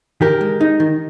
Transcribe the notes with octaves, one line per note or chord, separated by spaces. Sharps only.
D#3 G4 A#4
G#3
D#4
D#3